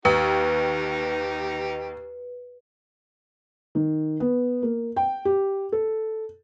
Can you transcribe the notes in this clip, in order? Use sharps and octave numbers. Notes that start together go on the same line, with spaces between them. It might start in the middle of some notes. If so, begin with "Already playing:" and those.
D#2 D#4 G4 B4
D#3
B3
A#3
G5
G4
A4